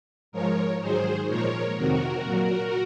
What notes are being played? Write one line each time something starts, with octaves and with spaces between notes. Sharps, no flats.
G#2 F3 G#3 A#4 C#5
G#2 D#3 F#3 G#4 C5
A#2 F3 G#3 A#4 C#5
F2 C3 D#3 F#4 A#4
A#2 F#3